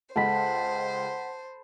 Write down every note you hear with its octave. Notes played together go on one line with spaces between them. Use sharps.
C#2 G#3 A4 C5 F#5 B5 B6